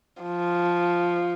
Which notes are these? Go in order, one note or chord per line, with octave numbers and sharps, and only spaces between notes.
F3